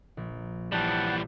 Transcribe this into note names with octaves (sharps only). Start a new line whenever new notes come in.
A#1
E3 G3 F#5 G5 A5